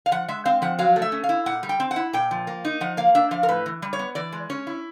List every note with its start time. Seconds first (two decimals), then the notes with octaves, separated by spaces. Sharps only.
0.06 F5
0.12 F3 F#5
0.28 G#3 E5
0.45 C4 F5
0.62 F3 F#5
0.79 F#3 F5
0.96 A3
1.02 E5
1.12 C#4
1.24 F5
1.29 E4
1.46 A#2 F#5
1.63 G3
1.69 G5
1.80 C4
1.91 F#5
1.96 E4
2.13 A#2 G5
2.31 F3
2.47 A#3
2.65 D#4
2.81 F3 F#5
2.97 A#3 F5
3.15 D4 E5
3.31 F3 F5
3.43 A#4
3.48 A2 B4
3.66 E3
3.82 G3
3.93 C#5
3.99 B3
4.15 E3 D5
4.33 G#3
4.50 C#4 C#5
4.67 E4